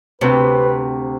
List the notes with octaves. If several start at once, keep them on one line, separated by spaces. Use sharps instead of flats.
D2 C3 C4 B4 G5